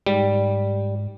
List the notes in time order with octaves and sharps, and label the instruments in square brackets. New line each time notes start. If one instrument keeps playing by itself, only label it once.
[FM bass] G#2 [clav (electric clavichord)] G3